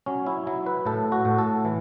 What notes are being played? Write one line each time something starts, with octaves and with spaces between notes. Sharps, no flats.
F#3 C#4
E4
F#3 E4
B4
A2 A4
F#4
A2
A4
E3